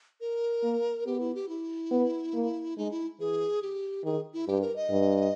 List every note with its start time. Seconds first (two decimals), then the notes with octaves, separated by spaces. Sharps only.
0.21 A#4
0.63 A#3
1.06 B3 G4
1.20 E4
1.35 G4
1.49 E4
1.91 B3
2.34 A#3
2.77 G#3 D#4
2.91 E4
3.19 E3 G#4
3.62 G4
4.04 D#3 G#4
4.34 E4
4.48 G2 G4
4.61 A#4
4.76 D#5
4.90 G2